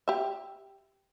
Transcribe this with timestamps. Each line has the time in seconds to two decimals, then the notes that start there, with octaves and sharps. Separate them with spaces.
0.08 G4 E5